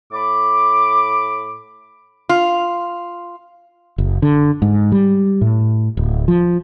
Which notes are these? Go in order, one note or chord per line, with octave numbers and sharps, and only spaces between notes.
A2 B5 D6
F4
F#1
D3
G#2
G3
A2
D1
F3